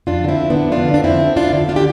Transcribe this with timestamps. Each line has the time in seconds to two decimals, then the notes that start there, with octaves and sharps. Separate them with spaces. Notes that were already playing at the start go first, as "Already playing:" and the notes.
0.07 F2 D4 F4
0.24 D3 C4 E4
0.40 F2
0.50 B3 D4
0.56 D3
0.71 F2 D4 F4
0.88 D3
0.94 D4
1.04 F2 C4 E4
1.20 D3
1.36 F2 D4 F4
1.53 D3
1.69 D4 F4
1.76 G4